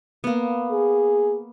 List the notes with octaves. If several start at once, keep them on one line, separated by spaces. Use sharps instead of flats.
A#3 B3
G#4